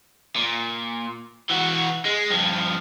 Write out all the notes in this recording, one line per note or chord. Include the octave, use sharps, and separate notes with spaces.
A#2
E3 F#4
G#3
G2 F3